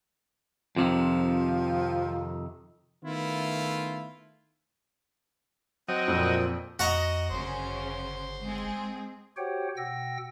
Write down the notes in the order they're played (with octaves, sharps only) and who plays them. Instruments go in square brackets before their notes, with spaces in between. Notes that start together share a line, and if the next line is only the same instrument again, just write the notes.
[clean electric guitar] F2 C3 D#3 [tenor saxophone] F3
[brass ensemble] D#3 A3 B3 E4 F4
[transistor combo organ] F#3 D#5 [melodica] C4 G5
[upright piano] F2 [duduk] A#2
[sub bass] F2 [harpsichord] F#4 F#5 A#5 [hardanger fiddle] D#5
[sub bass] G1 [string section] F#2 C#3 C#4 [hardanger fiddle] C5
[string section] G#3 C4 G#4
[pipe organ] F#4 G4 C5 C#5 F#5 G5
B2 F#5 G5 E6 A#6